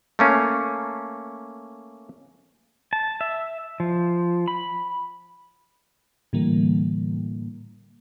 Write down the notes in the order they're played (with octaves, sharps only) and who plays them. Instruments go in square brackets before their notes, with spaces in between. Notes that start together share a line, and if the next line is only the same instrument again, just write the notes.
[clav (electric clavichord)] A3 A#3 C#4
[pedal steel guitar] A5
E5
F3
B5
[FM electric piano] A2 D3 E3 G3 A#3